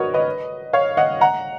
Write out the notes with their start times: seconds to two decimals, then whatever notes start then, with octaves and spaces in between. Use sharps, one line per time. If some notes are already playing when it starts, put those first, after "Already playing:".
Already playing: F#4 A#4 B4 C#5 D#5
0.14 B4 D#5
0.73 C#5 F5
0.97 D#5 F#5
1.21 F#5 A#5